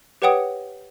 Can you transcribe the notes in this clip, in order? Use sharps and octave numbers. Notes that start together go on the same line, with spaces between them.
G4 B4 C#5 F#5 G5 D#6